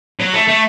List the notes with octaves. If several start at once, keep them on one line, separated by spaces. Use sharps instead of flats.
F#3
A3
A3